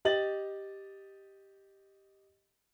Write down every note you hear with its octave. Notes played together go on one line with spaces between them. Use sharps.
G4 D#5 A6 F#7